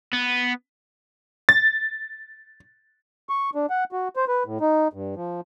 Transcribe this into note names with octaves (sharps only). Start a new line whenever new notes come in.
B3
A6
C#6
D4
F#5
F#4
C5
B4
A2
D#4
G2
F3